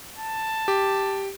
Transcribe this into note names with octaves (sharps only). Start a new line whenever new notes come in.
A5
G4